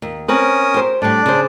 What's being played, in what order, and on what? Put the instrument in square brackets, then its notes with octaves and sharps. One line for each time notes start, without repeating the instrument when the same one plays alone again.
[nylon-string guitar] D#2
[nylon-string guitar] C4 B4 [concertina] C#4 A#4 D#6
[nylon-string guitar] G4 C5
[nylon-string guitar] A2 G3 [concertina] D4 D5
[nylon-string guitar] C#3 C5